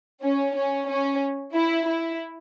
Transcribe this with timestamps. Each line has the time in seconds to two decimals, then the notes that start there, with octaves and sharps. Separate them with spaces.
0.22 C#4
0.55 C#4
0.88 C#4
1.54 E4
1.87 E4